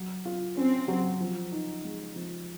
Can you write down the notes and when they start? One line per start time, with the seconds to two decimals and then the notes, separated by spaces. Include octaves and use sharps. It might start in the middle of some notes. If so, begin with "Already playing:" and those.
Already playing: F#3
0.25 F4
0.56 C4 C#4
0.88 F#3
1.20 F3
1.52 D#4
1.84 G#3
2.16 F3